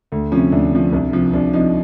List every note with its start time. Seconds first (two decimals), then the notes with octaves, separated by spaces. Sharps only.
0.12 D2
0.32 C3 F3 C#4
0.52 D2 D4
0.72 C3 F3
0.92 C2
1.13 C3 F3
1.33 C2 D4
1.53 C3 F3 D#4